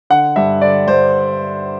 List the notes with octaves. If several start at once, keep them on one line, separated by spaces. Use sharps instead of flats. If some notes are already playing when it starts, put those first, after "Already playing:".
D3 F#5
G2 E5
D3 D5
G2 C5